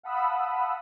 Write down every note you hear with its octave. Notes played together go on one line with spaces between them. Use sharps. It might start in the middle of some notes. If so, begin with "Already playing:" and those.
F5 F#5 A5 B5 D#6 E6